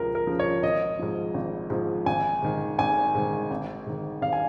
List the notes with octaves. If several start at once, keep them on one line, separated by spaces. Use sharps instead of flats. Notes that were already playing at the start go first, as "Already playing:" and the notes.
Already playing: C#2 C#3 F3 A#4
A#4
C#3 F3
C#5
G#1 D#5
G#2 F3
G#1
G#2 F3
G#1 G#5
G#2 D#3
G#1 G#5
G#2 D#3
G#1
G#2 D#3
G#1 F5
G#5